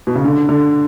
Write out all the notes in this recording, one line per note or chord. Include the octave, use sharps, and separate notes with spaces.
B2
C#3
D3
D3